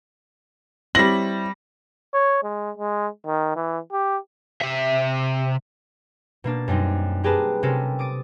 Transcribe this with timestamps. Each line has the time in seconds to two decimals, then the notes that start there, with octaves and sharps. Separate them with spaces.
0.95 G3 C4 E4 C#5 A#6 F#7
2.14 C#5
2.43 G#3
2.78 G#3
3.26 D#3
3.56 E3
3.92 G4
4.61 C3 E5
6.44 B2 A#3 D4 A6
6.68 F#2 G3 C4 D#4
7.24 C4 G4 G#4 A#4 B4 A5
7.63 C3 C4 C#4 G4 A4 A#4
7.99 D6 D#6 A6 D7